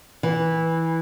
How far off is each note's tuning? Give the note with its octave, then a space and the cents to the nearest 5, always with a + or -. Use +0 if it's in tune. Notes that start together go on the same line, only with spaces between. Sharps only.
E3 -10